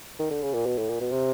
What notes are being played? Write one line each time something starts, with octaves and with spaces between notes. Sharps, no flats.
D#3
D3
C#3
A#2
B2
A2
A#2
B2
C3